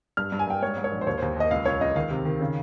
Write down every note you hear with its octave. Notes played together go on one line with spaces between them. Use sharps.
G2 F6
G2
G#5
G2 G5
G#2 C#5
G#2
C#5
A#1
C5
D#2 C#5
D#2 C5
D#2 D#5
C#2 F5
C#2 C#5
C#2 D#5
D#3 F5
C3
D#3
C#3